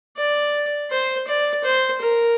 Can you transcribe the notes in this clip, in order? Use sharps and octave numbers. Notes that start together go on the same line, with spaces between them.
D5
C5
D5
C5
A#4